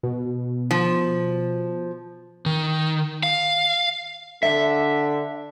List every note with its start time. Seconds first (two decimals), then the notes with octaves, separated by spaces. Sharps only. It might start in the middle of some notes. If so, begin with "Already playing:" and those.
0.03 B2
0.71 F3
2.46 D#3
3.23 F5
4.43 D3 E5